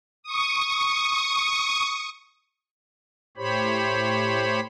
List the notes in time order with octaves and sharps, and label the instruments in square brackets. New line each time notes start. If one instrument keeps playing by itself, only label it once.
[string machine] C#6 D#6
[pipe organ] A2 G4 C5 C#5 B5